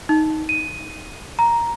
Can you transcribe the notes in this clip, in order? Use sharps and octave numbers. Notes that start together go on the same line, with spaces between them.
D#4
D#7
A#5